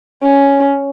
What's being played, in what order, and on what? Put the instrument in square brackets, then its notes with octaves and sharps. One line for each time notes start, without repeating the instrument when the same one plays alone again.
[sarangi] C#4